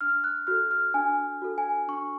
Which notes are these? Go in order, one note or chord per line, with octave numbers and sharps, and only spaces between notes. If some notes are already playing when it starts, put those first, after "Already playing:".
D4 F6
F#6
F#4 A4 F6
F6
D4 G#5
F#4 A4
G#5
D4 C#6